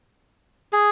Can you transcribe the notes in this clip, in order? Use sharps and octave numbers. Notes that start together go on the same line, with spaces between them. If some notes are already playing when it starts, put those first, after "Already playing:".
G#4